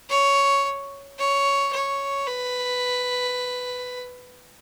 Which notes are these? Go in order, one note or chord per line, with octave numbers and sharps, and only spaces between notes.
C#5
C#5
C#5
B4